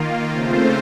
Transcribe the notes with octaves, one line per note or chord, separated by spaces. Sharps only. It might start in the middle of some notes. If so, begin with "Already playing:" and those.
Already playing: D#3 A#3 F4
C#3 A3 C4 F4 C5